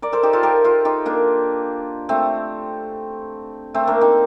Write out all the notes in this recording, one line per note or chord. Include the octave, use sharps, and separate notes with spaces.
A#4 D5
A4 C5
D#4 G4
F4 A4
G4 A#4
F4 A4
D#4 G4
A#3 D4
A3 C4
A3 C4
A#3 D4
C4 D#4